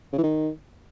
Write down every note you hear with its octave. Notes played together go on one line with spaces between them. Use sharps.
C#3
E3
D#3